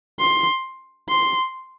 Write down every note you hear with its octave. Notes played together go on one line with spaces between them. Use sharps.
C6
C6